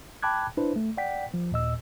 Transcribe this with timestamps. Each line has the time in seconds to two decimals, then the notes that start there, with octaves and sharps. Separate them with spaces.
0.23 G5 A5 B5 D6 F#6 G#6
0.57 D4 E4 B4 C5
0.76 A3
0.97 D5 F#5 G5 B6
1.34 F3
1.52 D#2 A#2 D#5 E6